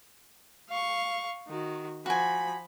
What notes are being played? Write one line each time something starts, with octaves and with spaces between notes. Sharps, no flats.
F5 C#6
D#3 F#4
F3 F#4 G#5 B5